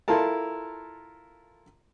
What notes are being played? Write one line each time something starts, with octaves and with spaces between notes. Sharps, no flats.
E4 F4 A4 A#4 A5